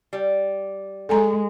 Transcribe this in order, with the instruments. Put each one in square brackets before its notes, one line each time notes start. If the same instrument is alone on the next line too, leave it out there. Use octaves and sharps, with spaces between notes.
[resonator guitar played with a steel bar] G3
[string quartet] G#3 [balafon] A4 G#5 A#5